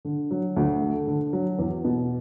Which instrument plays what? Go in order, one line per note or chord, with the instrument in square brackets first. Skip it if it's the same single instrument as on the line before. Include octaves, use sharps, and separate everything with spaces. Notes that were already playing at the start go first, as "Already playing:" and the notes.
[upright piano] D3
F#3
D2
A3
D3
F#3
E2
B2